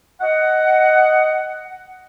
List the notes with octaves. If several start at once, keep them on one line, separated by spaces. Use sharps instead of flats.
D#5 F#5